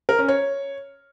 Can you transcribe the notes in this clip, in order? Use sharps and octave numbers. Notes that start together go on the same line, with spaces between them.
A#4
C#4
C#5